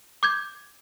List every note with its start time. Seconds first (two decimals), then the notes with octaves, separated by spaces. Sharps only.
0.23 D6 G6 G#6